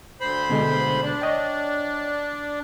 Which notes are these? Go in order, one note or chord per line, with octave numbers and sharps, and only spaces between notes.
D2 C5 B5
B2 D3 G#3
D4
C#5 D#5 G5